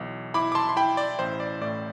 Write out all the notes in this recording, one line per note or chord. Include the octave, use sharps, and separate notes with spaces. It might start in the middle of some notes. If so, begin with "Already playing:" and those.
Already playing: B1 E3
E4 B5 D6
D6
A5 C6
C6
E4 G5 B5
D5
A1 C5
D5
A2 D5